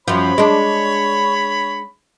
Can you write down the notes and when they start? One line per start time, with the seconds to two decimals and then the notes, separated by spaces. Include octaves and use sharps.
0.08 F#2 F3 C#5 B5
0.38 G#3 D4